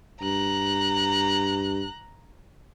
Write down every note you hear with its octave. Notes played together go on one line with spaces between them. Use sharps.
G2 A#5 F#6